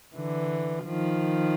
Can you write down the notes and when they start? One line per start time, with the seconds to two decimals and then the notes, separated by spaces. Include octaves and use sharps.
0.16 D3 E3
0.86 D#3 F3